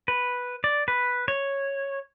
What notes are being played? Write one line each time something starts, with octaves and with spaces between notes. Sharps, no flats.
B4
D5
B4
C#5